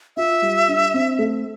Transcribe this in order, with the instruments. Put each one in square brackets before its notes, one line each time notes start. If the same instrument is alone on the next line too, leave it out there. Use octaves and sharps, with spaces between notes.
[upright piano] F4 [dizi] E5
[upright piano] G3
D4
C4
A3